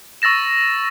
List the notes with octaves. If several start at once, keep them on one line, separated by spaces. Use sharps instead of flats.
C#6 E6 A6 A#6 E7